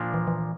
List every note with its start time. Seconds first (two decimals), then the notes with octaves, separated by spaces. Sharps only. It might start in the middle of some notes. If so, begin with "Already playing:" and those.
Already playing: A#2 F3 A#3 D4
0.14 E3
0.27 E3